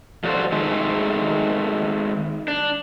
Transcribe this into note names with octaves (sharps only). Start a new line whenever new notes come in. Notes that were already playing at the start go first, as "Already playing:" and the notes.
F3 G3 F#4 A4 C5
D#3 G#3 A3
D4